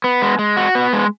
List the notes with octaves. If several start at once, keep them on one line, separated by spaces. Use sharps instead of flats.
B3
G#3
G#3
F#4
B3
G#3